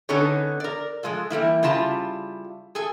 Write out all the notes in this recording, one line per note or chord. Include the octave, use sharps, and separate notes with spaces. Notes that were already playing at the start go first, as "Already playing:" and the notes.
D3 B3 C#4 D#4 A4 C#5
A#4 D5
F3 G#3 F4 A4
E3 G3 A#3 E4
C#3 G3 E4 F4 A5 A#5
G#4 A4 G#5